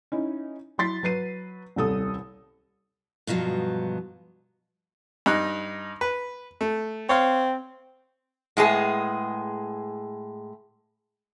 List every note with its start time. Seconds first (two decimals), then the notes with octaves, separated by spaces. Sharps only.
0.12 C#4 D#4 E4
0.78 F#3 E4 C6 A6 B6
1.03 F#3 B4 C7 D#7
1.76 D#1 C2 A4 D#6
3.27 G2 B2 F3 F#3 B3
5.26 G2 D#4 F#6
6.01 B4
6.61 A3
7.09 C4 C#5 F5
8.57 A2 G#3 B3 G#4